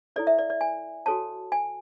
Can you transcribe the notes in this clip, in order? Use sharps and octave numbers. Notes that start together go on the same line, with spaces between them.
E4 A4 C#5 D5
E5
D5
D5
G#5
F#4 A4 C#5 A5
G#5